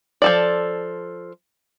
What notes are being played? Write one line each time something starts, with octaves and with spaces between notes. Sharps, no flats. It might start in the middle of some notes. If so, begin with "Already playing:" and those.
F3 A4 D5